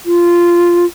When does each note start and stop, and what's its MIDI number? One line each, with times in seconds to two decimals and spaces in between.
0.06 0.85 65